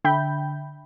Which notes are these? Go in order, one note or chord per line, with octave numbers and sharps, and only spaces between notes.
D3 E5 G5 B5 G6